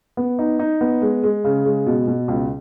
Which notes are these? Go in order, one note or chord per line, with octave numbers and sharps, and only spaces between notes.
B3
D#4
D#4
B3
G#3
G#3
C#3
G#3
B2
B2
C#2